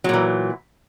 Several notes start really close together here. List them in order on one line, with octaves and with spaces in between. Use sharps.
F#3 A#2 E3